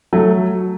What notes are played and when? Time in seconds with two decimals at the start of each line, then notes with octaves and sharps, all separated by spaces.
0.13 F#3 A3